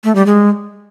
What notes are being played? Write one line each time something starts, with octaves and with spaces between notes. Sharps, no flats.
A3
G3
G#3